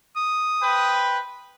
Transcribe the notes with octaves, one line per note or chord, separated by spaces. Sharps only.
D#6
B4 C5 G5